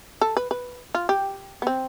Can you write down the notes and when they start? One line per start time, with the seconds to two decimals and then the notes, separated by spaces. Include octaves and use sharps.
0.21 A4
0.37 B4
0.51 B4
0.95 F4
1.09 G4
1.62 B3
1.67 C4